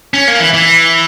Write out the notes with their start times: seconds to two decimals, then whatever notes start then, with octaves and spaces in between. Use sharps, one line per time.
0.14 C#4
0.28 A#3
0.40 E3
0.54 E3